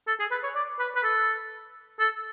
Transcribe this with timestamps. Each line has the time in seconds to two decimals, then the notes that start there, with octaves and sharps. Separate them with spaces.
0.07 A4
0.19 G#4
0.31 B4
0.43 C#5
0.55 D5
0.79 B4
0.96 B4
1.04 A4
2.00 A4